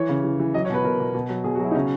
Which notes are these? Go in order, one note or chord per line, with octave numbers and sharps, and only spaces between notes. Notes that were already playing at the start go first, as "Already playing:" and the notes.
Already playing: E3 C#5
C#3
E3
E3
F#3 D#5
C#5
B2 B4
B2 A#4
B2
B2
F#3
B2 G#4
F#4
F#3 E4
D#4
C#3 C#4